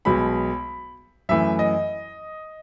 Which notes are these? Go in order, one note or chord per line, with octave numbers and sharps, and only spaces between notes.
B1 B2 G#3 B5
F#2 E3 A3 E5
D#5